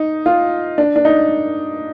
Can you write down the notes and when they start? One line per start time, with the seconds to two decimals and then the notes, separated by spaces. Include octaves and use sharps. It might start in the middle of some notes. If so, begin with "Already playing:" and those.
Already playing: D#4
0.26 F4
0.78 D4
0.96 D4
1.05 D#4